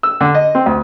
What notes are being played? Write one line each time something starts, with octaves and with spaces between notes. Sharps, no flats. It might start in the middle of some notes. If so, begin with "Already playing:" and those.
E6
D3
D#5
C4
D2